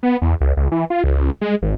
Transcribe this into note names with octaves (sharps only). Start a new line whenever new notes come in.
B3
E2
C#2
C#2
E3
F4
C#2
G#3
G#1